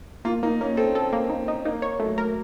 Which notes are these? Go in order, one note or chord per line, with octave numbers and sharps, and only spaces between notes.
A#3 F4
A#3 D#4
A#3 C#4
C4 A4
A4
A#3
D#4
D#4
A#3 D#4
C#5
F#3 A3
A#4